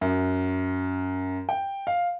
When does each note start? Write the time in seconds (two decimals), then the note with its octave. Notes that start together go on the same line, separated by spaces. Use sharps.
0.01 F#2
1.49 G5
1.87 F5